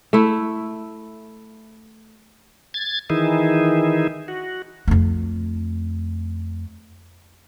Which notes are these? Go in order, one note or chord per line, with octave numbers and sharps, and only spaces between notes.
A3 E4
G#6 A6
D#3 E3 D#4 E4 G#4
F#4
F2 A3